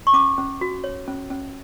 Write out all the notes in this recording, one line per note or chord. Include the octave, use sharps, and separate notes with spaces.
C#6
C#4 D6
C#4
F#4
C#5
C#4
C#4